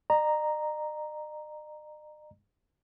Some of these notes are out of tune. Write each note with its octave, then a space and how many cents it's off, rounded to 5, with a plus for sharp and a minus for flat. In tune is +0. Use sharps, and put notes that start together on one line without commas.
D#5 -45 A#5 +0